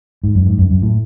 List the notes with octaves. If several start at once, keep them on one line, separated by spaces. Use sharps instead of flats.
G#2
F#2
G#2
F#2
F#2
A2